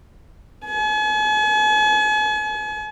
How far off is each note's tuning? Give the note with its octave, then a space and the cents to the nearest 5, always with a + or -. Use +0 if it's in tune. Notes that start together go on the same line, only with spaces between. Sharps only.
G#5 +45